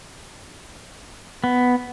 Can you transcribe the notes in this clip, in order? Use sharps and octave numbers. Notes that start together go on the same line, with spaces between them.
B3